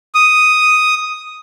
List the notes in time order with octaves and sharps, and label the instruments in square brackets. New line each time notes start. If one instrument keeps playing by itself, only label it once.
[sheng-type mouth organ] D#6